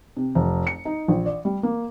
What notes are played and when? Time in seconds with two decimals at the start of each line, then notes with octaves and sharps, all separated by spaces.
0.17 C3
0.35 F1
0.67 C#7
0.85 D#4
1.08 A#1
1.26 D5
1.45 G3
1.63 A#3